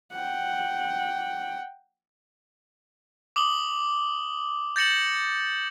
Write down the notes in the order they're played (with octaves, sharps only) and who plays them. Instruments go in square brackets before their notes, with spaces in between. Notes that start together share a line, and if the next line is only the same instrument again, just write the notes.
[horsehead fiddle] F#5 G5
[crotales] D6 D#6 F#7 G7
G6 A6 A#6 C#7 E7 F#7